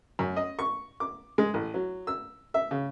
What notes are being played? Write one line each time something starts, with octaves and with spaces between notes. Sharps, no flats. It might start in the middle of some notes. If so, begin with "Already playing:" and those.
F#2
D#5
C#6
D6
G#3
A1
F#3
E6
E5
C#3